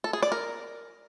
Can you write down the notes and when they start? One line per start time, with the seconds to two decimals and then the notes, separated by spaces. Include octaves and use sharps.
0.04 A4
0.13 G#4
0.23 D5
0.32 A#4